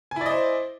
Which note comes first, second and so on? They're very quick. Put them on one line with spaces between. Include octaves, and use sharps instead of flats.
G#5 E4 D5 D#5 C5